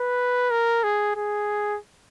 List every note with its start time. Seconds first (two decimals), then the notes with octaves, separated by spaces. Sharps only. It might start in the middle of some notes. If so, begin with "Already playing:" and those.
Already playing: B4
0.51 A#4
0.83 G#4
1.16 G#4